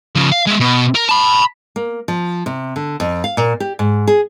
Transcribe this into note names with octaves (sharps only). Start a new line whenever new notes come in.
C#3 F3
F5
G#3 E5
B2
A#4
A5 B5
A#3
F3
C3
D3
F2
F5
A#2
G4
G#2
G#4